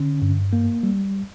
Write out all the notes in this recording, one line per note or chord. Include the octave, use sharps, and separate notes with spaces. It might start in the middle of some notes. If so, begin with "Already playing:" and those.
Already playing: D3 C#4
G2
A#3
G3